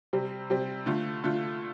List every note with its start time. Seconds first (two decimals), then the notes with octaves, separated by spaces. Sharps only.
0.13 C3 G3 C4
0.50 C3 G3 C4
0.86 D3 A3 F4
1.24 D3 A3 F4